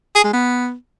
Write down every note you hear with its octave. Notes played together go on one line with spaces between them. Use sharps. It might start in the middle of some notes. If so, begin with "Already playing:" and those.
G#4
G#3
B3